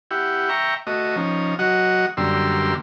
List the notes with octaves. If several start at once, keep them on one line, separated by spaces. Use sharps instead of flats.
E4 G4 F#5
E5 G5 A#5 C#6
A3 F#4 D#5
F3 C#4 D#4
F#3 F#4 D#5 F#5
F#2 D3 G3 A#3 C6 E6